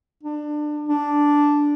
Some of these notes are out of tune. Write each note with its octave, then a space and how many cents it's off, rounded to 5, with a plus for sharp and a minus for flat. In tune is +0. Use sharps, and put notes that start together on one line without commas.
D4 +25
D4 -5